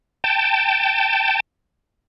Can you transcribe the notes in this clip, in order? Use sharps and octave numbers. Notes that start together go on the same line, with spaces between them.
G5 A5